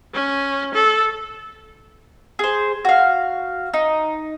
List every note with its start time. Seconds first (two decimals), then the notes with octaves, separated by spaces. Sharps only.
0.14 C#4
0.74 A4
2.39 G#4 C5
2.85 F#4 F5
3.73 D#4